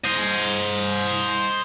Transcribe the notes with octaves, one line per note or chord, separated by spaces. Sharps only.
C5 D#5